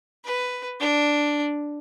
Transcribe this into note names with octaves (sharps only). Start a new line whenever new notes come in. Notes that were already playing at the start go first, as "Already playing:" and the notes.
B4
D4